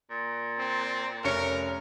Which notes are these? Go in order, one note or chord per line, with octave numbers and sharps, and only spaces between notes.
A#2
C4
F1 C#4 A#4 C#7